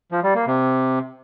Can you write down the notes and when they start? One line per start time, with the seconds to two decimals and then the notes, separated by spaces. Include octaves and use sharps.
0.12 F3
0.23 G3
0.35 A#3
0.47 C3